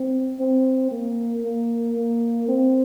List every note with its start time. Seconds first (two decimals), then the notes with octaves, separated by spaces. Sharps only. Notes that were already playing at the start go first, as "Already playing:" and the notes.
Already playing: C4
0.39 C4
0.91 A#3
1.44 A#3
1.96 A#3
2.48 C4